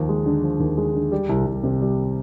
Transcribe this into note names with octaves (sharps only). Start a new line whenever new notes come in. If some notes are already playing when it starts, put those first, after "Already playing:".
Already playing: D#2 F3
G#3
D3
F3
D#2
G#3
D3
G3
C2
C2
C3
G3